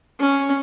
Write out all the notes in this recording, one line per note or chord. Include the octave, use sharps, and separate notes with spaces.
C#4